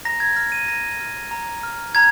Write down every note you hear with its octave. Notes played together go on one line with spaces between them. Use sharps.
A#5 A#6
G#6
F6 A#6
D#7
A#5 A#6
F6
A#5
F6
A#5 G#6